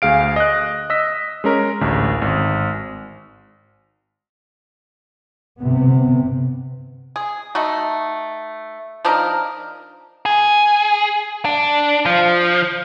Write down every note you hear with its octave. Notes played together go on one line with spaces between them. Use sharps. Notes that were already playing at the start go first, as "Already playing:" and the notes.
D2 G#4 F5 D7
D#5 F#6
D#5 E6 B6
G#3 C#4 A#4
A1 D2
G#1
G1 C3 B3
G#4
A3 D#4 F#4
F3 D4 D#4 A#4
G#4
D4
F3